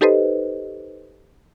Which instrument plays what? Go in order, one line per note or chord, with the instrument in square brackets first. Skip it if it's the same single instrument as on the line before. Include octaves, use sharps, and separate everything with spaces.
[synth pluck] D#4 G4 A4 B4 C5 D#5